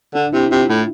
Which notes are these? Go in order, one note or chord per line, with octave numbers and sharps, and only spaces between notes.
D3 D4
C3 E4
C3 F4
A2